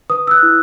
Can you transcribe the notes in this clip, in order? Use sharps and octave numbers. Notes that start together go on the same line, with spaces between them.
B4 D#6
E6
F#6
E4